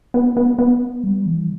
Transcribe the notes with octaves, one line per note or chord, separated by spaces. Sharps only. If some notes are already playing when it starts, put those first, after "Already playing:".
B3
B3
B3
G3
E3